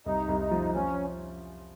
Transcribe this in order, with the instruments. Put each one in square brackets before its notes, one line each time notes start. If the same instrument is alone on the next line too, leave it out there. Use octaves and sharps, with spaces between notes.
[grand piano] C2 [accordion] D#4
[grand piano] C2
[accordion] D#4
[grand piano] F3
[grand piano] F3 [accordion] C#4